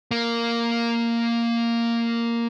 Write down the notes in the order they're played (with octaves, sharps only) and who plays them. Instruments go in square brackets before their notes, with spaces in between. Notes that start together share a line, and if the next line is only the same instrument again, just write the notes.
[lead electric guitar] A#3